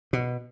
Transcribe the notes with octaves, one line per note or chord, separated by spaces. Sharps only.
B2